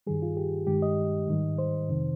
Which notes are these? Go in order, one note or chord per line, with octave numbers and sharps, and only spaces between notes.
G2 D#3 G3 G#4
F4
G4
G2 D#3 G#3 G4
D#5
G#2 D#3 G3
C5
F2 C3 D#3